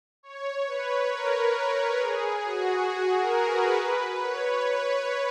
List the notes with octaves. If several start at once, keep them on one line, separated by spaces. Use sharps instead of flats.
C#5
B4
A#4
G#4
F#4
F#4
A#4
B4
B4
C#5
B4